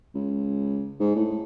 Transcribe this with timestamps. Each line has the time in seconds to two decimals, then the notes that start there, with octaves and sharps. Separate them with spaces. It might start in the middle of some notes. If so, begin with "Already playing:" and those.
0.15 C#2
1.00 G#2
1.16 A2